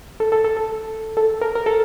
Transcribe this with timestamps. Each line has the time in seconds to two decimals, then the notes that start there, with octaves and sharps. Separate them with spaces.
0.20 A4
0.32 A4
0.44 A4
0.57 A4
1.17 A4
1.41 A#4
1.55 A#4
1.66 A4